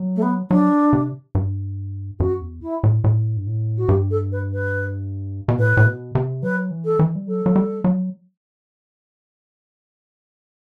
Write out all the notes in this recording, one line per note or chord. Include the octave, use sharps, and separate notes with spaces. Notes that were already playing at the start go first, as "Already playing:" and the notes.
Already playing: F#3
A3
B3
F#3 D4
C3
G2
F#2 F#4
E2
E4
A2
A2
G2
A2
F#4
G2 G4
A4
B4
B4
B2
A2 B4
A2
B2
C3
F#3 B4
E3
A4
E3
G3
F#3 A4
F#3
G3
F#3